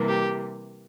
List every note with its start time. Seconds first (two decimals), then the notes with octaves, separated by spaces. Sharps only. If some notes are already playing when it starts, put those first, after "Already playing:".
Already playing: C3 E3 G3 A#3
0.08 G4